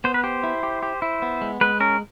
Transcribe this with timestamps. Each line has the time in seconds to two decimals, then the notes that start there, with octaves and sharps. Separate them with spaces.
0.04 B3 C5
0.14 B4
0.24 G4 C5
0.43 E4
0.63 G4
0.83 G4
1.02 E4
1.22 B3
1.41 G#3
1.61 G#3 B4
1.80 C#4 A#4